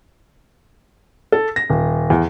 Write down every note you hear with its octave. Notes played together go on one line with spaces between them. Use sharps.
A4
A#6
D#1
E2